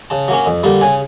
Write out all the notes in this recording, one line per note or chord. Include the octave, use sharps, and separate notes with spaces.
C#3 A5
F#3 A#3 C#4
F2
D3 G3 A#3
C#3 G#5